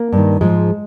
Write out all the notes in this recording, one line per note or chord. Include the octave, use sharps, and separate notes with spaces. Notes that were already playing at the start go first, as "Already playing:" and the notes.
Already playing: A#3
G2 D#3
G#2 F3 G#3